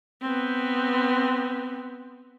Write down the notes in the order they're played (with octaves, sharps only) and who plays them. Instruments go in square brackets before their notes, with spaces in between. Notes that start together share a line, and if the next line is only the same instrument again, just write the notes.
[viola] B3 C4